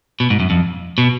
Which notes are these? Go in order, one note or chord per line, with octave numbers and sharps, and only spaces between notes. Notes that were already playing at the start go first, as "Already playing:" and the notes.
B2
G#2
F#2
F2
B2